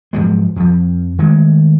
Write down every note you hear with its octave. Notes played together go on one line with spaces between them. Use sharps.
G#2 F3 F#3 G#3
F2 F3
D#3 G#3 A3